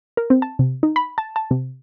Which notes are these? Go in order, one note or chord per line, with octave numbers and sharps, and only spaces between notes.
A#4
C4
A5
C3
D#4
B5
A5
A5
C3